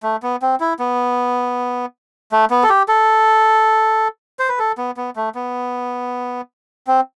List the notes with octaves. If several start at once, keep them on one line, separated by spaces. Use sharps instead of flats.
A3
B3
C4
E4
B3
A3
B3
A4
G4
A4
C5
B4
A4
B3
B3
A3
B3
C4